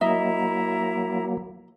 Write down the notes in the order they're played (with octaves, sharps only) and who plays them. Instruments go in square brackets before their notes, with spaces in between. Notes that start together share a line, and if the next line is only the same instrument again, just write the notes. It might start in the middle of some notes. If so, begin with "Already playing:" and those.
[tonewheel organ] F#3 A#3 [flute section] E4 A#5 [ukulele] D#5 E5